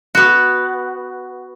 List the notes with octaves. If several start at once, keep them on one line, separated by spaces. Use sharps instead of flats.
B3 F#4